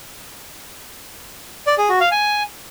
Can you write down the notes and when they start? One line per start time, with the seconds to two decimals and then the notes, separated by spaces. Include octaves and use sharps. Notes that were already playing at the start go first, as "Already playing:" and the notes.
1.67 D5
1.78 G#4
1.89 F#4
2.00 F5
2.11 G#5